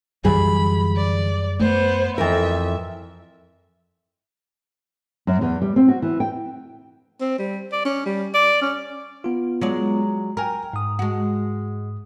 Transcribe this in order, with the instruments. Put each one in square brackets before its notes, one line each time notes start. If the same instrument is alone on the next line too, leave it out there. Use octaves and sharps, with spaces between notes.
[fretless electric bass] F#2 F#3 G3 [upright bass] D3 E3 [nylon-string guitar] G#4 [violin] B5
[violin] D5
[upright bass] A3 [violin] B3 C5
[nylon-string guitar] F2 E3 A#4 [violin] E5
[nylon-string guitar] F#2
E2
G3
C4
F#4
E3
G5
[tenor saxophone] C4
G3
D5
C#4
G3
D5
C#4
[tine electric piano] B3 F4
[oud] F#3 G#3 D5
[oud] A#4 [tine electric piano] G5 G#5 A#5
[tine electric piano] G#2 D#6
[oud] G#3 F#4